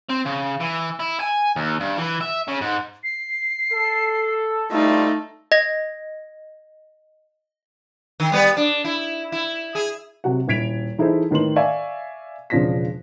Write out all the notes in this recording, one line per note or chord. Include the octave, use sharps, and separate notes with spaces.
C4
C#3
E3
E4
G#5
D#2
G2
E3
E5
C#3
G#2
C7
A4
D2 G3 A3 D#4 F4
D#5 A#6
D#3
G3 B3 B4
D4
E4
E4
G#4
C3 F#3 F#4 F#5
D#1 E4 G#6 B6 D7 F7
E3 D#4 E4 G#4 A4 C5
A2 D#3 B4 C6 F#7
D5 E5 F5 G#5 C#6
E1 C#3 F3 D4 A#6 B6